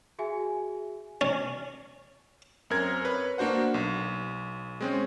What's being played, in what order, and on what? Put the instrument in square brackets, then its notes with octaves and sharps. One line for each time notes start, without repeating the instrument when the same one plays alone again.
[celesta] F#4 G#4 E5 G#5
[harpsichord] C#4
[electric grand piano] F#2 C4 A#4 G#6
B4 C#5
A#3 D4 F#4 C5 F#5
B1
G#3 C4 C#4